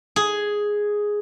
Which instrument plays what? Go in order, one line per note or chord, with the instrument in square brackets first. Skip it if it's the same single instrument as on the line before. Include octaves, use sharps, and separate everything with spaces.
[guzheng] G#4